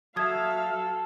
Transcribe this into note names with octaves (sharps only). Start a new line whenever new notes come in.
F#3 F#4 A4 E5 F5 D#6 G#6